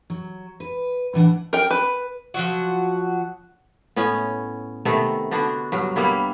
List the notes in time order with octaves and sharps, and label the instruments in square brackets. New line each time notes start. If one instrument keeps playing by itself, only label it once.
[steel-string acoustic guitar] F#3
B4
A2 E3 D4 F#5
[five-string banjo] A#4 G5
B4
[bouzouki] F3 F#3 F#4
[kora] A2 B3 C#4
C3 D#3 A3 B3
D3 B3 D4 F#4
G2 F#3
G3 A#3 B3 E4